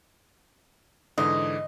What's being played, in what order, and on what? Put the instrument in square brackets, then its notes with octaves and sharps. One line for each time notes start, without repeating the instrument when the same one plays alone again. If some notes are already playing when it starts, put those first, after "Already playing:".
[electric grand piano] G#2 D3 E3 [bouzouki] D#5